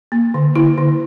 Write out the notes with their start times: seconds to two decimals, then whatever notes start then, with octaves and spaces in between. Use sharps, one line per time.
0.12 A#3
0.34 D3
0.56 D3 E4
0.78 D3